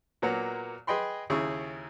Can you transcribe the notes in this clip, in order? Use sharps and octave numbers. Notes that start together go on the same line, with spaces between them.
A#2 F#3 A#3 B3 F#5
G#4 B4 D#5 G5 B5 C6
D#2 C#3 E4 G#4 C#6